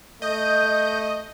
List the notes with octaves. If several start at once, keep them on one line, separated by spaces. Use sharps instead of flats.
A3 D#5 G6